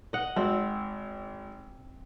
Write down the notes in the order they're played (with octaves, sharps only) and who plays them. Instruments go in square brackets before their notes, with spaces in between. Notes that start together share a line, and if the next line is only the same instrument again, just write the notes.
[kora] D#5 F#5
[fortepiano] G#1 [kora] C4